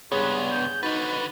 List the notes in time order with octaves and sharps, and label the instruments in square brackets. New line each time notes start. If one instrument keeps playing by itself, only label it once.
[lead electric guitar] C#2 B3 [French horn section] G2 [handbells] G#4 C#5 [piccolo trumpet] B4
[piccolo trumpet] G6
[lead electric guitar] D3 B4 [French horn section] D#4 [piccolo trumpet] F#4 [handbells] A6